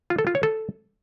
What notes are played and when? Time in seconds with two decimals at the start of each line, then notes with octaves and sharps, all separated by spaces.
0.10 F4
0.19 A4
0.27 F4
0.35 C#5
0.43 A4